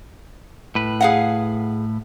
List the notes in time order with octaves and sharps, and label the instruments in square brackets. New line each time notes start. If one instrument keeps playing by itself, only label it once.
[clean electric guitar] A2 B4
[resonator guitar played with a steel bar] G#4 F5 F#5